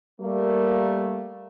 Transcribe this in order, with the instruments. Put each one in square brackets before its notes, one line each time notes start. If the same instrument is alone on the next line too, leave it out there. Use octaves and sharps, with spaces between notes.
[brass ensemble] G3 A3 A#3